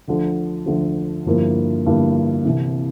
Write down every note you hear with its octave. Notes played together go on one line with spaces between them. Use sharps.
D2 D3 F3
D2 D3 F3
G1 G2 F3 A#3 E4
G1 G2 F3 A#3 E4
C2 C3 E3